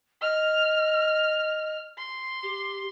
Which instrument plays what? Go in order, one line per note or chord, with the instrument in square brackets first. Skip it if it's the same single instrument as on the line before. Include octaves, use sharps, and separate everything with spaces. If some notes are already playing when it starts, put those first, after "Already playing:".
[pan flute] D#5 [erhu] F6
[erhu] C6
[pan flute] G4